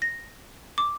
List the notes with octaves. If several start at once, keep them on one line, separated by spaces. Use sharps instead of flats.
A#6
D6